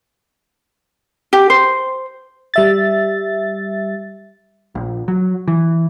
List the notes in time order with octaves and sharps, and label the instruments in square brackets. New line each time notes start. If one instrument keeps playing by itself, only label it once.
[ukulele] G4
C5
[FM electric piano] G3 E5 A6
[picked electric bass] A#1
F#3
E3